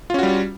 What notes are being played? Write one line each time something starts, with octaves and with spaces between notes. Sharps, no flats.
G3 C#4 F4 F#4